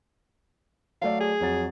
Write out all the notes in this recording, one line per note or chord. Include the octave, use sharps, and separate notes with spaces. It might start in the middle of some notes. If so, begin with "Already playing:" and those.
F#3 A3 D5 F5
G#4
F2 F#3 A6